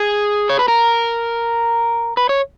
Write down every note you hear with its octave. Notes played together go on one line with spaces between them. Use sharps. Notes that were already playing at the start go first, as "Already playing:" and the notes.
Already playing: G#4
C#5
B4
A#4
B4
C#5